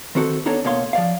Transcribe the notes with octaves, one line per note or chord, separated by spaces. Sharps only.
D#3 C4 F#4 A4 C5
B3 D4 D#4 A4 C#5
B2 A#3 C#5 F5 C6
F3 D5 F5